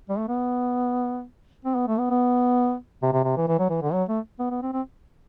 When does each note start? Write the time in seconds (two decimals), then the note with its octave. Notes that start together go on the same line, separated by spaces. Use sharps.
0.09 G3
0.18 A3
0.28 B3
1.65 C4
1.76 B3
1.88 A3
1.99 B3
2.11 B3
3.03 C3
3.13 C3
3.24 C3
3.37 E3
3.48 E3
3.59 F#3
3.70 E3
3.82 D3
3.93 F#3
4.09 A3
4.39 B3
4.50 B3
4.62 C4
4.73 C4